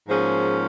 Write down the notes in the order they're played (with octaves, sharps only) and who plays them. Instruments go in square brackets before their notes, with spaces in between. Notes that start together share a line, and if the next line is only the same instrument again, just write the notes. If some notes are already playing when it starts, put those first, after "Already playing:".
[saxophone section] G#2 F3 A#3 C#4 G#4 C5